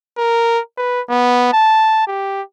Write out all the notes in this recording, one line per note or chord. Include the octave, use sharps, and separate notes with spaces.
A#4
B4
B3
A5
G4